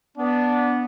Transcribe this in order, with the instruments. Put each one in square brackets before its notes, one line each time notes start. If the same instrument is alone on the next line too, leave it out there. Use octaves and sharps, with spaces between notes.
[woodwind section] B3 [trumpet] D4